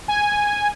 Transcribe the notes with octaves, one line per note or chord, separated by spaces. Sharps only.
G#5